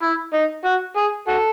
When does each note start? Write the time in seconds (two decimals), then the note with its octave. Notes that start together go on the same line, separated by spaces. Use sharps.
0.02 E4
0.33 D#4
0.65 F#4
0.96 G#4
1.27 F#4 A4